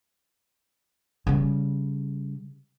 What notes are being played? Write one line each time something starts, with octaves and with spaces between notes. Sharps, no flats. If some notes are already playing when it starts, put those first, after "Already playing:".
C#3 G3